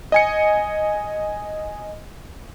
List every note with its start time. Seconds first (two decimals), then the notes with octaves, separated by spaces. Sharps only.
0.12 D#5 G#5 C#7